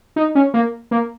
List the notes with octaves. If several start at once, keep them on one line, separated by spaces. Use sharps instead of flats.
D#4
C#4
A#3
A#3